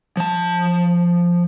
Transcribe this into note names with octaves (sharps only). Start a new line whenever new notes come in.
F3 A5